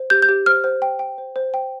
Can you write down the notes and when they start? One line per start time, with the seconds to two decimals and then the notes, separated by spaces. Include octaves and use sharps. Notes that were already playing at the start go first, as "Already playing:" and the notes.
Already playing: C5
0.10 G4 G6
0.22 G6
0.29 G4
0.46 C5 F6
0.64 C5
0.82 G5
0.99 G5
1.18 C5
1.36 C5
1.54 G5